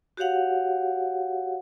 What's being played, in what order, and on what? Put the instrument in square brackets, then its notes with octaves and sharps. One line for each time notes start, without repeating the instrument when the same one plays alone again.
[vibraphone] F#4 G4 C#5 F5 F#5